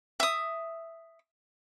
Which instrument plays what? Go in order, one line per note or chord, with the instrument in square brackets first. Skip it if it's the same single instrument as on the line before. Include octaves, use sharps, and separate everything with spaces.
[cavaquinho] E5 D#6